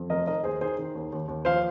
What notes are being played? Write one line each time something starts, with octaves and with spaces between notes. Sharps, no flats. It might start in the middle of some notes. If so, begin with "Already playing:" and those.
Already playing: F2
F1 A#4 D#5
D#3 A#4 D#5
D#2 G#4 C5
D#3 G#4 C5
D#3
D#2
D#2
D#2
F3 C5 F5